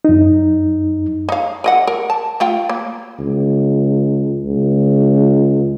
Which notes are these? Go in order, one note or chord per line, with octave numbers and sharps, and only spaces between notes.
F#2 D#4
D#4 F5
A#4 D#5 F#5
A#4
A5
A3 F4 G5
A#3
C#2
C#2